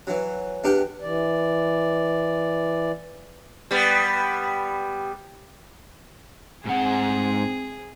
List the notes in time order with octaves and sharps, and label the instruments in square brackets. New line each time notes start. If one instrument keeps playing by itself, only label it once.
[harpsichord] E3 F#3
E2 D4 G4 B4 G5
[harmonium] E3 D5
[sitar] G3 B3
[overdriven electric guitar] G#2 F#5 [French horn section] C4 [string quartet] G#4